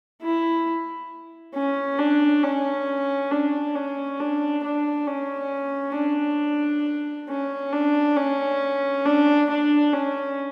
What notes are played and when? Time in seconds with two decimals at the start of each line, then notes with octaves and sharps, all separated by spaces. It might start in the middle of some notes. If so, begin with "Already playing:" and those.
0.22 E4
1.55 C#4
1.99 D4
2.43 C#4
3.31 D4
3.75 C#4
4.20 D4
4.64 D4
5.08 C#4
5.96 D4
7.29 C#4
7.73 D4
8.17 C#4
9.05 D4
9.50 D4
9.94 C#4